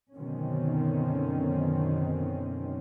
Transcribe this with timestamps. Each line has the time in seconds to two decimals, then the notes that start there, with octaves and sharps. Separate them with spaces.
0.14 F#2 B2 D3 D#3 C4 C#4